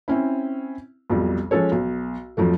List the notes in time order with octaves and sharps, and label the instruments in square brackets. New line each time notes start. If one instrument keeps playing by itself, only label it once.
[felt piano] C4 C#4 E4
B1 F2 G3
F3 G#3 C#4 A4 C#5
B1
F2 F3 F#3 A3